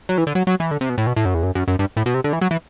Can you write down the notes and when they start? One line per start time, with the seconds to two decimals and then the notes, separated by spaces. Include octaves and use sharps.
0.09 F#3
0.18 E3
0.27 D3
0.35 F#3
0.47 F#3
0.60 E3
0.71 D3
0.81 C3
0.89 B2
0.98 A2
1.07 B2
1.16 A2
1.25 F#2
1.34 E2
1.43 F#2
1.55 F#2
1.68 F#2
1.79 G2
1.97 A2
2.06 B2
2.14 C3
2.24 D3
2.33 E3
2.41 F#3
2.51 E3